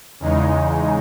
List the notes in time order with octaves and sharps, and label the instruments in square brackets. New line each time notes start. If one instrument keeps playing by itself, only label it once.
[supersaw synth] E2 C#3 G#3 D#4